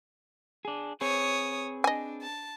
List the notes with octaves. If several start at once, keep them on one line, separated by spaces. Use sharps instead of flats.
D4 G#4
C4 G#4 B4 C#5 D#6
D4 D#5 G#5
A5